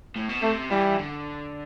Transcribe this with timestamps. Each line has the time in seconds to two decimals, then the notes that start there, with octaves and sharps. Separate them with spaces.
0.16 A2
0.29 B2
0.42 C3 A3
0.70 E3 G3
0.99 D3